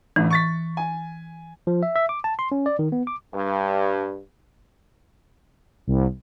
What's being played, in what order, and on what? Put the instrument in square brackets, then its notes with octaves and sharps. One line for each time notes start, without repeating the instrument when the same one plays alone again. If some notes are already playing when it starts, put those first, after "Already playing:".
[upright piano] A1 A2 D3 [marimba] E3
[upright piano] C#6 A6 B6
G#5
[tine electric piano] F3
E5
E5
D6
A5
C6
C#4
D5
D#3
B3
D6
[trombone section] G2
[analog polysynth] C2